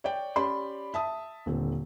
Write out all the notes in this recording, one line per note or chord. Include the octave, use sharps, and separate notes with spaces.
C#5 D5 G5
C#4 G4 D5 B5 C6
E5 A5 D#6
D#1 D3 C4